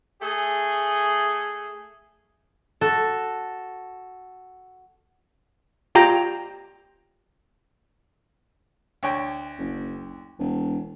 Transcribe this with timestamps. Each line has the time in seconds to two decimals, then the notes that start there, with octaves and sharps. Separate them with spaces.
0.23 A3 G#4
2.81 F#4 A4
5.95 F4 G4 G5 A#5
9.03 D2 C#5 G5
9.59 F#1
10.39 E1